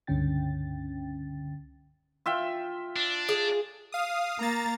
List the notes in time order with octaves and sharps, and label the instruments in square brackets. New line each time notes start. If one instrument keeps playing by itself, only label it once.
[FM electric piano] C#2 G2 D3 C#4 G5 A6
[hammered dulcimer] F4 E5 G5
[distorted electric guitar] D4
[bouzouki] G#4
[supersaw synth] F5 D#6
[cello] A#3 [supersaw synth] A#5 A6